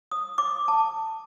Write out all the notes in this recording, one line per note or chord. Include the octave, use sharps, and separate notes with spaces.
D#6
D6
A5